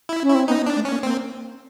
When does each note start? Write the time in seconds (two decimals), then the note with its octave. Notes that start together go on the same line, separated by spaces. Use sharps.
0.09 E4
0.23 C#4
0.29 E4
0.35 C4
0.48 B3 D#4
0.61 B3
0.66 D4
0.76 A3
0.85 C#4
0.90 A#3
1.03 A#3 C4